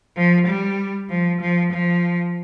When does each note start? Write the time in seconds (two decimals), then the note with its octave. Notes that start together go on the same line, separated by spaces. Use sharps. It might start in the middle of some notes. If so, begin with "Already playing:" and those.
0.16 F3
0.47 G3
1.10 F3
1.41 F3
1.72 F3